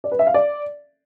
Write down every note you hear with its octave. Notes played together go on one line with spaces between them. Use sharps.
D5
B4
E5
F5
D5